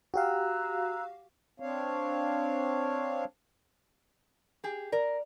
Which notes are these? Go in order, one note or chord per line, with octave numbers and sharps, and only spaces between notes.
F#4 G4 F5 A#5 E6 F#6
C4 D4 C#5 F5
G4 G#4
A#4 D5